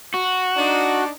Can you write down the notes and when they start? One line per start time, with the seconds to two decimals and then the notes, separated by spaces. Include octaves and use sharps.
0.14 F#4
0.57 D4 D#4